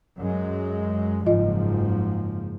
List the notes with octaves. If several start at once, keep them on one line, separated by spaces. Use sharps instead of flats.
F#2 G#3
F#1 G#2 F3 F4 D#5